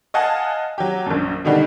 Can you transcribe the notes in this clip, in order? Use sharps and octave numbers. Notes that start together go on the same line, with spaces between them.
D#5 F5 F#5 G#5 A5 D#6
F#3 G4
A#1 F#2
B2 D3 D#3 G3 D4 D#4